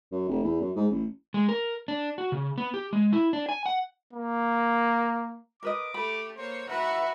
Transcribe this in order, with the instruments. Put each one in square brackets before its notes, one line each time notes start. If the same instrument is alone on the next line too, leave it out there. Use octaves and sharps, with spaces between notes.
[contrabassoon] F#2
F1
E2
F#2
G#2
A1
[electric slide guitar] G#3
A#4
D4
F#4
C#3
B3
G4
G#3
E4
D4
G#5
F#5
[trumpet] A#3
[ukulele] A#4 B4 D#5 [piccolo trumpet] D6
[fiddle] A3 G4 [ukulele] B5
[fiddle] A#3 C#5 [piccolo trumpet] C5
[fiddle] F#4 A#5 [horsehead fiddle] B4 E5 [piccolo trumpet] F#5